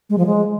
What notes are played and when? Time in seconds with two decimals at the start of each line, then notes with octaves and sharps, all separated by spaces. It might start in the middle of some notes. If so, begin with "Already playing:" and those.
0.10 G#3
0.18 F3
0.26 G#3